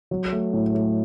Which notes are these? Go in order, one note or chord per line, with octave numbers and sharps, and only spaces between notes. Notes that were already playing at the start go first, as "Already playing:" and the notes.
F#3
A3
A2
A3